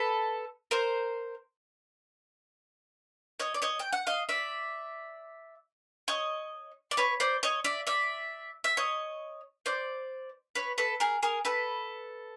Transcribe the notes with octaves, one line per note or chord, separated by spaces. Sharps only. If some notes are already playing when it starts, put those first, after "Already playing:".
Already playing: A4 B4
A#4 C5
C#5 D#5
D5
C#5 D#5
G5
F#5
D#5 F5
D5 E5
C#5 D#5
D5
B4 C#5
C5 D5
C#5 D#5
D5 E5
D5 E5
E5
C#5 D#5
C5 D5
B4 C#5
A4 B4
G#4 A#4
G#4 A#4
A4 B4